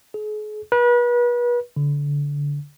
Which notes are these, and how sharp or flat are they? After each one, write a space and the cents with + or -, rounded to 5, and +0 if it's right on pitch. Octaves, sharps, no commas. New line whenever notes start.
G#4 +40
B4 -35
D3 -25